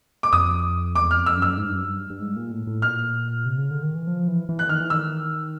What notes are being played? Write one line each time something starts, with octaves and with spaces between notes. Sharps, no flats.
D6
F2 D#6
E2 D6
F6
F2
E6
F#2
E6
G#2
G2
F#2
G2
G2
G#2
A#2
A2
A2
A#2 F6
C3
C#3
D3
D#3
E3
F3
E3
E3
F#6
D#3 F6
E3
D#3 E6